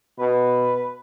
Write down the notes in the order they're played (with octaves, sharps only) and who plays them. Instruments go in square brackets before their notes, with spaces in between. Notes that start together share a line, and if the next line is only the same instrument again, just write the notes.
[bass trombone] B2 [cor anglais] B4